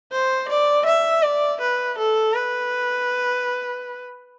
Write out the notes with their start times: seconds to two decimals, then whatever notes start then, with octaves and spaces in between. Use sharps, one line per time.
0.12 C5
0.49 D5
0.86 E5
1.23 D5
1.61 B4
1.98 A4
2.34 B4